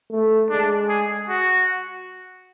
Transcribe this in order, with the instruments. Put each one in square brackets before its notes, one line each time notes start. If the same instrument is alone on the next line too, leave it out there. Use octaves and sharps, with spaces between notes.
[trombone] A3
[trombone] G#3 [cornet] D4
[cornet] G#4
F#4